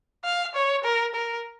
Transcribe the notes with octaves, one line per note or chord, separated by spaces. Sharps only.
F5
C#5
A#4
A#4